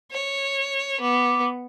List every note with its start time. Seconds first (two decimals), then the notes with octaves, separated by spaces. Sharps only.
0.11 C#5
1.00 B3 D6